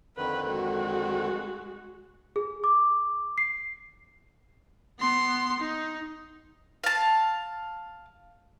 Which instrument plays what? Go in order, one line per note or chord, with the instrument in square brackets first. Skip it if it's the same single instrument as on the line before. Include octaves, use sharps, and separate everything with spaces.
[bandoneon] F2 D3 D#3 [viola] B4
[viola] G#3 F#4
[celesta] G#4
D6
C7
[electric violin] B3 C6
D#4
[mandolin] F5 A5